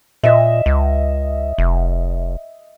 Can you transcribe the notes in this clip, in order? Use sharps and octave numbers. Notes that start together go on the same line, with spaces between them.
A#2 D#5 E5
C#2
F1